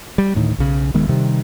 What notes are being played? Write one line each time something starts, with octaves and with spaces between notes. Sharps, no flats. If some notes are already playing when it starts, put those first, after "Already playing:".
G3
D2 A2 D#3
B1 C#3
D#1 D#3 G#3 B3
C3 D#3 G3